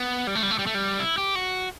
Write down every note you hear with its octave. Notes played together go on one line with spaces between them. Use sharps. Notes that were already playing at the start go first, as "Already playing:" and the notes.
Already playing: B3
G3
A3
G3
A3
G3
A3
G3
E4
G4
F#4